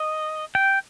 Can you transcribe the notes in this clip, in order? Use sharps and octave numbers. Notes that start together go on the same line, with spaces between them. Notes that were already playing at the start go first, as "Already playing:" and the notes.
Already playing: D#5
G5